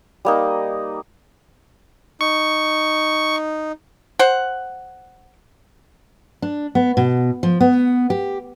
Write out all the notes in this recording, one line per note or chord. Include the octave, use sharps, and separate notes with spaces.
G3 A#3 D#4
D#4 C#6
C5 F#5
D4
B3
B2
F3
B3
G4